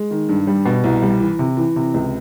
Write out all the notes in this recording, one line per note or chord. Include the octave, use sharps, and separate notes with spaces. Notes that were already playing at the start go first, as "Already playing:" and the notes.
Already playing: G#3
D#3
G2
G3
B2
C2
G3
E3
C3
E3
C3
C#2